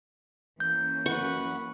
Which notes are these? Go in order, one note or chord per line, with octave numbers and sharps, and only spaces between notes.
E3 A#3 C#4 G6
F#2 B4 F#5 C#6